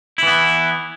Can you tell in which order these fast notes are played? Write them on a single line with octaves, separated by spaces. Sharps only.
E4 E3 B3